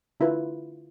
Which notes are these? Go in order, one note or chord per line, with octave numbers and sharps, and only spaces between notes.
D3 E4 F4 B4